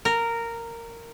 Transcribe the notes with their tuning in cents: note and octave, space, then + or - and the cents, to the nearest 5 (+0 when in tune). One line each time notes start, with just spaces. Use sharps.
A#4 -10